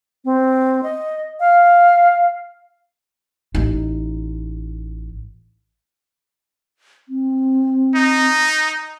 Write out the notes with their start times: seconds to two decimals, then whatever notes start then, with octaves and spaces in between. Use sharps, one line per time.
0.25 C4
0.83 D#5
1.40 F5
3.55 A1 D#4
7.09 C4
7.95 D#4